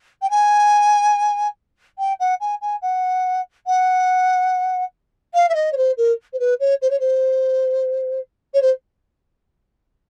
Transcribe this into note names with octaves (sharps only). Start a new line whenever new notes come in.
G5
G#5
G5
F#5
G#5
G#5
F#5
F#5
F5
E5
D#5
C#5
C5
A#4
C5
B4
C#5
C5
C#5
C5
C#5
C5